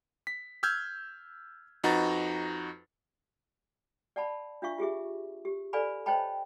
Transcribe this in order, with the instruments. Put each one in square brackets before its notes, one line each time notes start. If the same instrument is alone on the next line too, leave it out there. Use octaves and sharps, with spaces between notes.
[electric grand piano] B6
E6 F6 G6 G#6
F2 D#4 F#4 B4 A#5 A6
[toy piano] D5 F#5 A5 B5
D4 F4 E5 F5 C#6
F4 G4 G#4 E5
G4
A4 B4 D5 F5 G#5 B5
C5 C#5 D#5 G5 A5 B5